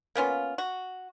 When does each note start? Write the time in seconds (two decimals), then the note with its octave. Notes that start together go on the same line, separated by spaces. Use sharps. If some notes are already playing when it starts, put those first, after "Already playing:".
0.15 A#3 B3 C#4 F4
0.58 F#4